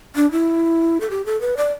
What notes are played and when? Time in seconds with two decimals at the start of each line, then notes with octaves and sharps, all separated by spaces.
0.16 D4
0.32 E4
1.01 A4
1.10 G4
1.26 A4
1.41 B4
1.57 D5